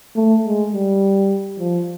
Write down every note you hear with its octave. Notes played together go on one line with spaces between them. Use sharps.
A3
G#3
G3
F3